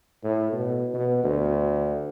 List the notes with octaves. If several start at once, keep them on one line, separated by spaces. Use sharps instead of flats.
A2
B2
B2
D2